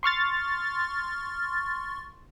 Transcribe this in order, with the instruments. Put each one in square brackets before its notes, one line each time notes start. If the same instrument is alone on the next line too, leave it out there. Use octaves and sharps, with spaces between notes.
[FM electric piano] C6 C#6 F6 A6